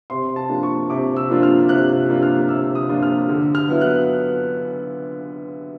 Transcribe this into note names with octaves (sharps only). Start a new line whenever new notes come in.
C3 C6
A5
F3 A#3 D4 F4
C#6
C3 D6
E6
F3 A#3 D4 F4
F6
C3 F#6
F3 A#3 D4 F4
F6
C3 E6
D#6
F3 A#3 D4 F4
F6
D3
F6
F#3 B3 E4
F#6